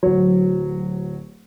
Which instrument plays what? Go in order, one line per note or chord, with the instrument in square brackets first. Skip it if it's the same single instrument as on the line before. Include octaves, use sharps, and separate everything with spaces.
[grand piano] D1 F#3